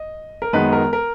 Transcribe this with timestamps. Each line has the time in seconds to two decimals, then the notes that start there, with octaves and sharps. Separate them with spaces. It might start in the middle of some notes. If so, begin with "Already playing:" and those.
Already playing: D#5
0.42 A#4
0.53 F#2 D#3 G#3 B3 B4
0.73 A#4
0.93 A#4